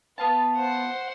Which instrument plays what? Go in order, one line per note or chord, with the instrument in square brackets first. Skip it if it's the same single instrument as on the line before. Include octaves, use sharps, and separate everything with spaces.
[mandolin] B3 F4 A5 [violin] B4
[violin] C5 F#5